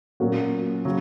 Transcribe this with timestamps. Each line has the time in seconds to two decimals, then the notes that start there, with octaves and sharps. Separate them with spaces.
0.20 A#2 F#3 A#3 C#4 F#4
0.85 C#3 F#3